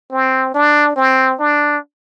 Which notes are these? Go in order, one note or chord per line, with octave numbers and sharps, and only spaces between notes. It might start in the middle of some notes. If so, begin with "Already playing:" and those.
C4
D4
C4
D4